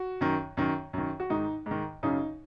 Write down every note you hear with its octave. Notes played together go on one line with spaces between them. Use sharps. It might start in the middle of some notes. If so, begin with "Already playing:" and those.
Already playing: F#4
F#2 D#3
F#2 D#3
F#2 D#3
F#4
G#2 D#3 D#4
G#2 D#3
F#2 C#3 D#4